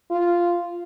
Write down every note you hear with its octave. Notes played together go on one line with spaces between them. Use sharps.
F4